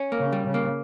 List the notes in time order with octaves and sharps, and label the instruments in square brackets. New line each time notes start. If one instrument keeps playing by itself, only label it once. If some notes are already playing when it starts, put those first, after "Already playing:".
Already playing: [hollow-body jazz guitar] C#4
A#3
[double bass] C#3
[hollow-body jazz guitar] G3
[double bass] C#3
[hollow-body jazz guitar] A#3